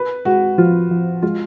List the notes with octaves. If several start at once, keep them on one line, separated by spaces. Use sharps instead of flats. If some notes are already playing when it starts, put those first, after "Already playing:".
Already playing: B4
G#3 F#4
F3 F4
F3
G#3 F4